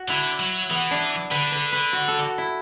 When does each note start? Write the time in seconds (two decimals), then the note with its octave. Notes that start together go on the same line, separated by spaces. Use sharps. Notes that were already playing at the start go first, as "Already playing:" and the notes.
Already playing: F#4
0.09 D3 E4
0.40 F#3
0.71 E3 B3
0.91 D4
1.31 D3 B4
1.52 B4
1.72 B4
1.93 F#4
2.08 A4
2.22 F#4
2.38 E4